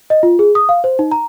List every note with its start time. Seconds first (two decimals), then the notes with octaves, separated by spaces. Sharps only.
0.10 D#5
0.23 F4
0.39 G#4
0.55 D#6
0.69 F5
0.84 C5
0.99 D#4
1.12 A#5